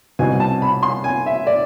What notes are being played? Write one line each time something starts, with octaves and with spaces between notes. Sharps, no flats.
C2 B2 G#5
A5
B5
C6
G#5
E5
D5